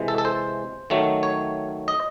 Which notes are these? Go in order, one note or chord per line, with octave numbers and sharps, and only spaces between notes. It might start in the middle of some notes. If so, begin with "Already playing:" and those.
Already playing: C3 E3 G#3
A4
A4
C5
D#3 F#3 A3
C#5
D#5